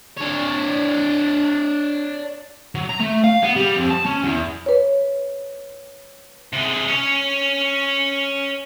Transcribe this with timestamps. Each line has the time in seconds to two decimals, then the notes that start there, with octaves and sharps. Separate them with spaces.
0.17 D4 C#5
2.75 F#3
2.89 A#5
3.00 A3
3.24 F5
3.43 B3
3.56 G3
3.77 F2
3.90 A5
4.06 C#4
4.24 E2
4.66 B4 C#5
6.53 C3 G#3
6.88 C#4 C#5